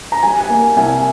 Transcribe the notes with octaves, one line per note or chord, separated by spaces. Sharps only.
A#5
G3 G#5
G#5
A#3
C2 G#5